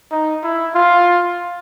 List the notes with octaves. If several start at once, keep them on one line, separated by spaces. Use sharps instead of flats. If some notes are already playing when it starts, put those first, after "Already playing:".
D#4
E4
F4